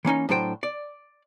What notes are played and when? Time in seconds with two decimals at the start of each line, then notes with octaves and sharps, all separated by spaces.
0.05 E3 A#3 C#4 D#4
0.29 A2 F#3 D4 C5 G5
0.63 D5